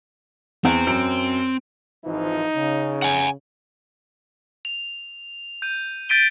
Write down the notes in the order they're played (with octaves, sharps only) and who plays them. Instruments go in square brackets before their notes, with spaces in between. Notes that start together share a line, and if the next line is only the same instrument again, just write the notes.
[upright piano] E2 [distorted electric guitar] C4
[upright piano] F#2 D7
[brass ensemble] G#1 E3 F3 [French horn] D#4
[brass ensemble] C#3
[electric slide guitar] F#5 G#5
[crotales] F7
G6 D#7
G6 A6 B6 D7 D#7 G7